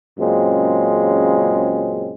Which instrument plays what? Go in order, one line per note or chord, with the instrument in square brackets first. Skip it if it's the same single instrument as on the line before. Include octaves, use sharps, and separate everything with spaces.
[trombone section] F#2 A#2 C#3 G#3 C4